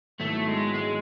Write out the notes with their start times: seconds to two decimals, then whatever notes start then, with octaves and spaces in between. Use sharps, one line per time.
0.20 G#2 D#3 F#3 A3 B3 E4
0.48 G#3
0.75 G#3